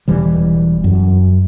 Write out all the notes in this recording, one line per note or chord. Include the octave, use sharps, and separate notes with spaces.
E1 E3 G3
F#2